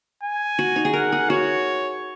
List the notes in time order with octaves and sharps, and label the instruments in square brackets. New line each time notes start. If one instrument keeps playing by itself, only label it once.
[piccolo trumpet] G#5
[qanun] F#4
D#4
G#4
[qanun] A#4 [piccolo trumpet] F#5
[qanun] G#4
[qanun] F#4 [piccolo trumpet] C#5